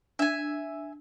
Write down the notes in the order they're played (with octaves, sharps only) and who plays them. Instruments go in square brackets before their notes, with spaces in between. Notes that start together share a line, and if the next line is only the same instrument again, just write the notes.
[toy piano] D4 [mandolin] E5 G#5